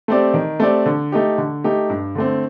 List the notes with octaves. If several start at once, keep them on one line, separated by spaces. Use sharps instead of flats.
A3 C4 G4 D5
D#3
A3 C4 G4 D5
D3
A3 D#4 G4
D3
A3 D#4 G4
G2
D3 A3 C4